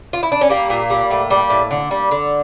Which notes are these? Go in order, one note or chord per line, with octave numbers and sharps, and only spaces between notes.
F4
E4
D4
C#4
G3 A#3
A#2
G3
A2
G3
A2
D3
G3
D3